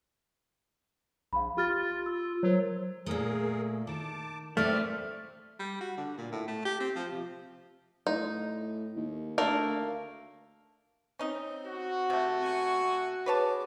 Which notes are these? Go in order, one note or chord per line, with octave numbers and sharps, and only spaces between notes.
A#1 F5 B5
F4 G4 F6 A6
E6
F#3 A#4 C5 C#5
A#2 A3 G#4 A#4
D#3 A5 D6
A3 A#3 C4 D4 B4 D5 E5 F6
G3
F#4
D3
A#2
A2
A3
G4
C4
F3
C3
A2 D#4
D#2
D2 A3 A#3 A#4
C4 C#4 D#4
F#4
C3 A3
G#5 C#6
G#4 B4 C#5 A5 D6